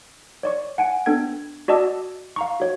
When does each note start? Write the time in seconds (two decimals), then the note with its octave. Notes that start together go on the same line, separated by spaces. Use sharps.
0.43 C#5 D5 C#6
0.78 F#5 G#5 D7
1.06 B3 D4 A4 G5 G#6
1.68 F#4 D5 D#5 A5 D6 E6
2.36 F5 A#5 C#6
2.60 F#4 C#5